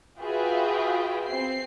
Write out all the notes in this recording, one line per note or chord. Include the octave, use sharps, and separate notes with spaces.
F4 F#4 G#4 B4 E5 G5
C4 C7